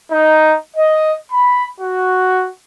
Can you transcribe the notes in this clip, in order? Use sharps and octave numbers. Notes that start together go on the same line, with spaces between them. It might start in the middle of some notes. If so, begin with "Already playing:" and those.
D#4
D#5
B5
F#4